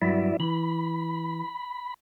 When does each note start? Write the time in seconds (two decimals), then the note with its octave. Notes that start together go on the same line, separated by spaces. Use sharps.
0.02 G2 F#3 E4 D5 E5
0.40 E3 B5